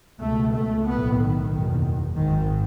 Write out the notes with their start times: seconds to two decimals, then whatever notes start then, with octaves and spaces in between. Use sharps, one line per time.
0.20 C#2 B2 A3
0.52 A3
0.85 B1 A2 B3
1.18 D#3
1.51 F#1 E2 B2
2.15 G#1 G#2 D#3